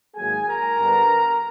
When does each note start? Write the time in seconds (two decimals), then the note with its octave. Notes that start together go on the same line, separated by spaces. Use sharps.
0.15 G#2 D#3 F#3 A#3 G#4 G#5
0.47 A#4 A#5
0.78 G2 D3 G3 B3 D4